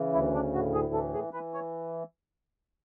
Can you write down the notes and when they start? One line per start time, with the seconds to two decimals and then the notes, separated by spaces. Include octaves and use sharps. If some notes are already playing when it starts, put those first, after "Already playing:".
Already playing: C#3 E3
0.13 D2 E4
0.34 D4
0.53 A2 F#4
0.74 G#4
0.93 E3 A4
1.14 G#4
1.33 E3 B4
1.54 C#5